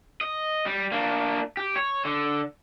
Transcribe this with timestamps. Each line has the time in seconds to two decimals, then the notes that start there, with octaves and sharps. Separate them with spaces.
0.21 D#5
0.66 G3
0.92 A#3 D4
1.57 G4
1.76 C#5
2.05 D3